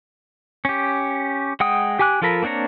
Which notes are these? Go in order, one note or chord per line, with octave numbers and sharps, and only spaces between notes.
C#4 G4
G#3 F#5 G5 D#6
G4 G5 G#5 D6 F#6
F3 F4 A4 A#4 B5
A#3 C4 D4 C#5 A#5